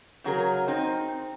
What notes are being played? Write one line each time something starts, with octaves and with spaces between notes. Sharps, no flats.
C#3 F#3 G#4 A#4
C4 D#4